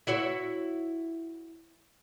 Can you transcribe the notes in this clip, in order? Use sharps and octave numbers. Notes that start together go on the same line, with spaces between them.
E4 F#4 C#5